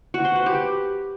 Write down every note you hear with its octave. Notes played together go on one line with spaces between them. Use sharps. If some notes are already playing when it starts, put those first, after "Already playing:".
F#4
C5
B4
G4